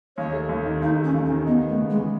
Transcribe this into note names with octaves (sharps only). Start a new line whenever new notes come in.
D#2 C#5
A3
D#2
D#3
D#2 D#4
A3
C#4
D#2
C#4
D#3
B3 D#4
B3
A3
C#3
G#3
E3